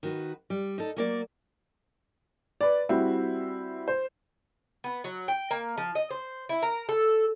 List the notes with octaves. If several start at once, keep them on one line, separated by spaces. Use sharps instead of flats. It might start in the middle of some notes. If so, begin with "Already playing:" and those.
D#3 F#4 B4
G3
D#4 A4
F#3 A#3 D5
B4 D5
G3 C4 E4 F#4
C5
B3
F#3
G5
A#3
F3
D#5
C5
E4
A#4
A4